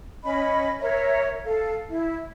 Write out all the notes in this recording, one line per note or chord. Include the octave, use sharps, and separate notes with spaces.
C#4 D#5 B5
A#4 C#5 E5
A4 F5
E4